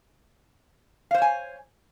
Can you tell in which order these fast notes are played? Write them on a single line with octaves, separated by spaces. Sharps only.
F5 C5 C#5 G#5